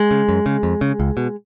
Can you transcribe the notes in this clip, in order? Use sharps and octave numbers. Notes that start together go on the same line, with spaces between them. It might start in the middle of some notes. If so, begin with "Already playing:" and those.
Already playing: G#3
C#3
F#2
C#3
F2
C#3
C#2
B2